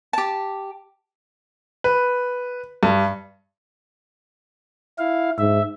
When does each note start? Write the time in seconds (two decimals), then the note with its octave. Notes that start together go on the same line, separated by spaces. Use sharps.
0.13 G4 A5
1.84 B4
2.83 G2
4.99 E4 F5
5.38 G#2 E5